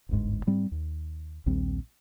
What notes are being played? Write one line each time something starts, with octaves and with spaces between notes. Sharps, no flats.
D1 G1 G#2
G#2 G3 C4
D#2
A#1 D#2 G3 C4